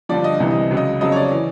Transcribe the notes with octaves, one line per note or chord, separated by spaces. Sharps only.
G2 D3 F3 D5
D#5
C2 C3 E3
D#5
C#2 C#3 F#3
D#5
F2 C#3 F#3 D#5
C#5
D5
E3